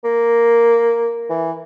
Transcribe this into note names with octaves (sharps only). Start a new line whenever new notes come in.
A#3
E3